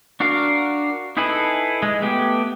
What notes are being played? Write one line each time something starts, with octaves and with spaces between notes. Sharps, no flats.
D4 F#4 A#4 F5
D#4 E4 G#4 A4 B4
G#3
A3 B3 G4